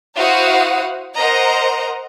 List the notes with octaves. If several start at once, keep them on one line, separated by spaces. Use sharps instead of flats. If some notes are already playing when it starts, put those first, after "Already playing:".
E4 F#4 C5 F5 F#5 D#6
A#4 C5 D#5 F#5 A#5